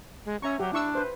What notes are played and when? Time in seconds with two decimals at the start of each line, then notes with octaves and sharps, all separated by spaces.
0.25 G#3
0.42 C#4 E5 A#5 C#6
0.60 F#3 G4
0.73 D4 E4 C#6 E6
0.95 B4 C5